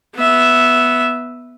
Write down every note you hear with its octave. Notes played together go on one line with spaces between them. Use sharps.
B3 E5